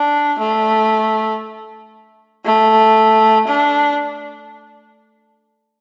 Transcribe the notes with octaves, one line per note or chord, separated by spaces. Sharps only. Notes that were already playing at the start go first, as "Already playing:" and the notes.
Already playing: D4
A3
A3
D4